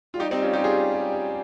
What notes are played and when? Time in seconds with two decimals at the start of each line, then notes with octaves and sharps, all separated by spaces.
0.14 F4
0.20 G3 D#4 G4
0.31 C4 D#4
0.42 C#4 F4
0.53 D#4 G4
0.64 F4 G#4